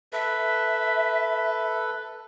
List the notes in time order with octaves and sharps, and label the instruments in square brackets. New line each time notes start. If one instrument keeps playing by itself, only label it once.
[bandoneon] A4 B4 [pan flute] E5